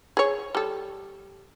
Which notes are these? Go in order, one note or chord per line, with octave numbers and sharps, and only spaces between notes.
G#4 C#5
G3 A4